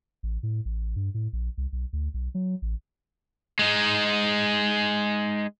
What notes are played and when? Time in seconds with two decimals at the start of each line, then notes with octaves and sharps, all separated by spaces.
0.23 A1
0.43 A2
0.65 A1
0.96 G2
1.14 A2
1.33 A#1
1.58 C2
1.72 B1
1.93 D2
2.14 B1
2.35 F#3
2.62 A1
3.59 G#3 D#4